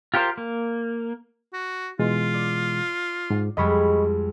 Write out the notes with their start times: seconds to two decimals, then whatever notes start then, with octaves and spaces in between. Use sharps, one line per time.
0.14 F4 G4 A#4 C5 F5
0.37 A#3
1.53 F#4
1.99 B2 E3 G#3 F4
2.34 D5
3.30 G#2
3.57 F2 G3 G#3 D#5 B5 C#6